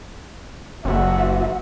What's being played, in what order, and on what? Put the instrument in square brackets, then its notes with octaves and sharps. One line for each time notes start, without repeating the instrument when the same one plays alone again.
[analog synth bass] F#1 [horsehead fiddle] F#4 E5